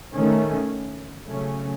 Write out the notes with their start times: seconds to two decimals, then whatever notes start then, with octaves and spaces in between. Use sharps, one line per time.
0.13 D#3 A3 C#4
1.28 C#3 F#3 A3 C#4